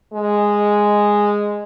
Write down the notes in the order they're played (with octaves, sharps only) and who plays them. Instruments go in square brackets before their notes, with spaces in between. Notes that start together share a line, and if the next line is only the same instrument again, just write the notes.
[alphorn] G#3